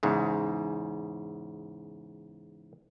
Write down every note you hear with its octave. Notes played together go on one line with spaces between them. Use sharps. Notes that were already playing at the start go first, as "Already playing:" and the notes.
E2 G#2 C#3